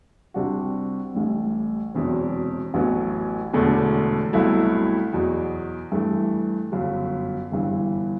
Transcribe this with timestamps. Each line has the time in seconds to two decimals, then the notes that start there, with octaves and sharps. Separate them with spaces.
0.34 C2 C3 G3 D4 F#4
1.15 A1 A2 G3
1.94 E1 E2 C3 F#3
2.74 A1 A2 F#3 B3
3.53 E1 E2 D3 A3
4.33 C2 B2 F#3 A3 E4
5.13 E2 B2 F#3
5.92 G2 E3 A3
6.72 G1 F#2 F#3
7.52 G1 G2 E3